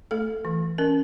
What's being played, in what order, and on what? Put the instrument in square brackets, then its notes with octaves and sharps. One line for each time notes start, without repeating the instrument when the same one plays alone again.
[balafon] A3 A4
E3
C#4 A#4